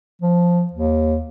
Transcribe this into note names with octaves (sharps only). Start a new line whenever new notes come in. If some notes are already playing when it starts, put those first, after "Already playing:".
F3
D#2